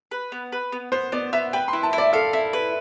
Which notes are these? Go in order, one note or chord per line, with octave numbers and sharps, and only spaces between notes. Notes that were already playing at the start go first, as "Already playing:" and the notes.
B4
B3
B4
B3
B3 C5
B3 D5
B3 E5
B4 G5
E4 C6
A5
E4
D5
A4 F5
E4
B4